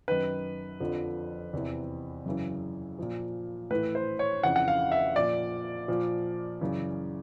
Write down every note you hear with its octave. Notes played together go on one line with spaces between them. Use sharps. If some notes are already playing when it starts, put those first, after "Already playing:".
F#2 D#3 B4
F2 D3 F3
E2 C3 E3
F#2 C#3 E3
A#2 F3
A2 E3 B4
C5
C#5
F2 C#3 E3 F#5
F#5
F5
E5
A#2 F3 D5
A#2 F3
F#2 C#3 E3